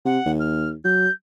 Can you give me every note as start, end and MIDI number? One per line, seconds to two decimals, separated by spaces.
0.05 0.19 48
0.05 0.31 78
0.25 0.75 39
0.40 0.69 89
0.84 1.07 54
0.84 1.11 91